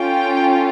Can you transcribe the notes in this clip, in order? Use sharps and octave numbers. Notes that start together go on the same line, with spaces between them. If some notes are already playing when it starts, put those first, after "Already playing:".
Already playing: C#4 F4 A4 G5